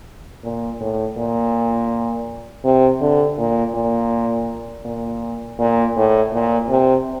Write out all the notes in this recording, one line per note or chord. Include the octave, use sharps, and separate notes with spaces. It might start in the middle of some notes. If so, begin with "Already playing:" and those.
A#2
A2
A#2
C3
D3
A#2
A#2
A#2
A#2
A2
A#2
C3